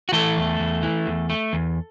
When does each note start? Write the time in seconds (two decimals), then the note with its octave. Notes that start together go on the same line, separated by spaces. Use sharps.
0.09 F#4
0.12 E3 A3 A4
0.37 E2
0.60 E2
0.83 E3
1.07 E2
1.30 A3
1.53 E2